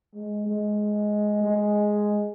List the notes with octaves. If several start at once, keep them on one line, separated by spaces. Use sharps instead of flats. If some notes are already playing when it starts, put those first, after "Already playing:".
G#3
G#3
G#3